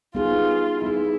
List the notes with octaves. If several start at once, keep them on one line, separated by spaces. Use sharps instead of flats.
G3 B3 D#4 F4 G#4
G3 B3 D#4 E4 G#4